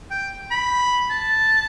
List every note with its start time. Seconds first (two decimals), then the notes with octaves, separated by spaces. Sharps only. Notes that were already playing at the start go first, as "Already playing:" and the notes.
0.11 G5
0.51 B5
1.10 A5